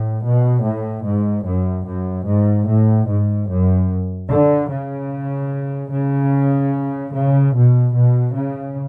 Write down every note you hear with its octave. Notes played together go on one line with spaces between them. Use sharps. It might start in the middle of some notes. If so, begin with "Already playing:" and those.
Already playing: A2
B2
A2
G#2
F#2
F#2
G#2
A2
G#2
F#2
D3
C#3
C#3
C#3
B2
B2
C#3